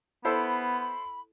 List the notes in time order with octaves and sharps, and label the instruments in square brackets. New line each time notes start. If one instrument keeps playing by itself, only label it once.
[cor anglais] B3 [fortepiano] E4 A4 C5 [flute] B5